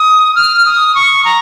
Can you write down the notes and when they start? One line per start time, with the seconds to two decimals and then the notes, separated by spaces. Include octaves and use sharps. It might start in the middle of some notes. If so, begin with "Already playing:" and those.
Already playing: D#6
0.36 F6
0.66 D#6
0.95 C#6
1.25 A#5